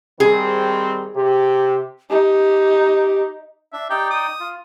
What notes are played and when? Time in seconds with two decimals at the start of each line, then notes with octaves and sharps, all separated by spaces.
0.20 D#3 G3 C4 G#4
1.16 C3 G4
2.10 D#4 G4
3.73 D4 E5
3.90 D#4 G4 D5 G5
4.10 D#6
4.40 F4